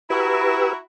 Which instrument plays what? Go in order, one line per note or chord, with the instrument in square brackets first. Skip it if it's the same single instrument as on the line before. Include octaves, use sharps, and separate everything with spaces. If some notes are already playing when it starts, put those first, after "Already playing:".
[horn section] E4 F#4 A#5 [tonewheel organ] G4 B4 E6